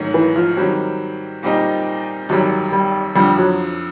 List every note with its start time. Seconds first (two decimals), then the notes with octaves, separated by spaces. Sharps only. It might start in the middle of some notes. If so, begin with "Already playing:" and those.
Already playing: G#2 D#3 F#3 A3 C#4
0.14 E3
0.36 F3
0.57 D#3 F#3 G3 C4
1.43 A#2 G3 C4 D#4
2.29 G#1 F#2 D#3 F#3 G3
2.72 G3
3.15 F2 D3 F3 G3
3.38 F#3